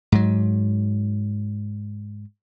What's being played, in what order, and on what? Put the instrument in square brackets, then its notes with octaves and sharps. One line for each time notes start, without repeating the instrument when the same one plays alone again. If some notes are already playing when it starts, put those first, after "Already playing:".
[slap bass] G#2 F#3